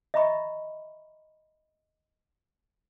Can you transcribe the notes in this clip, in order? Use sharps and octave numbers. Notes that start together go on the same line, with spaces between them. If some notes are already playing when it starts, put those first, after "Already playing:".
D#5 E5 A#5 B5 C#6